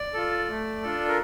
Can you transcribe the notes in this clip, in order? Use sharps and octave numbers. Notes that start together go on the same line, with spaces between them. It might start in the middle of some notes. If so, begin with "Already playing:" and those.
Already playing: D5
F4 A4
A3
D4 F4 A4
A#4